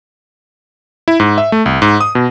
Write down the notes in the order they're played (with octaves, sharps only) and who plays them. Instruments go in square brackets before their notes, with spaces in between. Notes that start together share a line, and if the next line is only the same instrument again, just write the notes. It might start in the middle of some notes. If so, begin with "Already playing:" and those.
[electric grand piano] E4
G#2
E5
A3
C2
G#2
D#6
B2